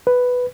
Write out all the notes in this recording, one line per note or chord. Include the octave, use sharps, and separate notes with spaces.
B4